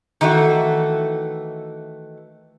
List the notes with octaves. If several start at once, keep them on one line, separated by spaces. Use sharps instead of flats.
D#3 E3 A3 F#4